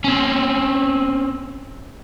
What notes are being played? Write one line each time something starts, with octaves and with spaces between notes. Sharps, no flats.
C4 C#4